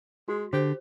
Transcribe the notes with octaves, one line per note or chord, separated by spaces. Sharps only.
G#3 F#4
D3 G4 C5